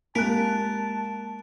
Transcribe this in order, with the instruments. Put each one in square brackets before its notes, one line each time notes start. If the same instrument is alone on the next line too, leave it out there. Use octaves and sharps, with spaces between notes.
[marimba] G#3 C4 G4 [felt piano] A#3 F#6 [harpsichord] A#4 [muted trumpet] A5